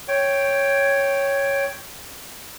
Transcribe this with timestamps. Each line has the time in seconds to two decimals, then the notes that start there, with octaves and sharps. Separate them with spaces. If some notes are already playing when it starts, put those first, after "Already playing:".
0.08 C#5 G5